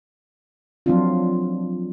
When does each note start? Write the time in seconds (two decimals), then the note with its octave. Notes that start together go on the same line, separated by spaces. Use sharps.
0.86 F3 F#3 A3 C4 D4 F4